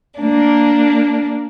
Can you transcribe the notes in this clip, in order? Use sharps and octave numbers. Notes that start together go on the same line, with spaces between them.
A#3 D4